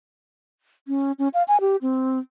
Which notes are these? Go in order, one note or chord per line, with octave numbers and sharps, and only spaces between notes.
C#4
C#4
F5
G#5
G4
C4